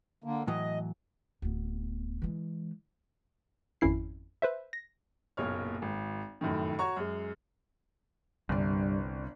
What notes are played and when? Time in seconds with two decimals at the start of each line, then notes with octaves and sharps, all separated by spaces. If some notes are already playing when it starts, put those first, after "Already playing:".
0.24 D3 A#3
0.47 A2 E3 F#3 D#5
1.42 D1 B3
2.22 E3 G#3
3.81 G#1 F2 C#4 E4 C7
4.42 B4 C5 E5
4.73 A#6
5.37 F#1 B1 A#2 C#5 F6
5.82 G#1
6.41 F1 F#2 A2 D#3
6.79 F#4 C#5 A#5 C#6
6.97 F#2 G#3
8.49 G1 C2 G2 D5